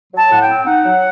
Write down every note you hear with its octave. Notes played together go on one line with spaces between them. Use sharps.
F#3
A5
A2 F#5
G5
C4
D#4 F#5
F#3